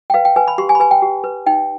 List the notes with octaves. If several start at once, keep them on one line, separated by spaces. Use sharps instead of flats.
G5
B4 F5
G5
B4 G#5
B5
G4 C6
G#5
B5
B4 G#5
G5
G4
B4
D#4 G5